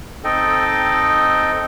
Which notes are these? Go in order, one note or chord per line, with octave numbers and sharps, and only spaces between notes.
C4 D#4 A4 D#5 G5